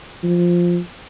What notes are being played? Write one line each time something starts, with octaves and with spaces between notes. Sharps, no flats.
F3